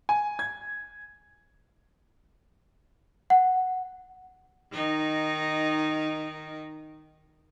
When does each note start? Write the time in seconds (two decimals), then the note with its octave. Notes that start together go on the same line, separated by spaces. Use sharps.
0.09 G#5
0.39 G#6
3.30 F#5
4.73 D#3 D#4